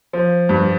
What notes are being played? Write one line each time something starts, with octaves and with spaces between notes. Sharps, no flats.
F3
G2